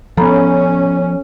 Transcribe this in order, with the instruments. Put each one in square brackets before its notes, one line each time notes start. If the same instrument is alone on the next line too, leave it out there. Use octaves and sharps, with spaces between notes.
[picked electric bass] F3 B3 [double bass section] C#4 [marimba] A4 A#5 B5